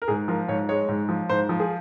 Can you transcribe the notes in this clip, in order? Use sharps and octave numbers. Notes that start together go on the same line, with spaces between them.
A#4
G#2 G#4
F3 A#4
G#2 C#5
G#3 C#5
G#2
F3
G#2 C5
F3
G#4